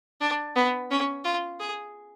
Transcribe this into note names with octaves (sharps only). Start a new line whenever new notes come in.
D4
B3
C#4
F4
G#4